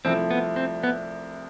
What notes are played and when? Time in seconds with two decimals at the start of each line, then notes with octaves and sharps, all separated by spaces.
0.05 C2 C3 F3 A3 C4 E4
0.31 B3
0.56 C4
0.83 B3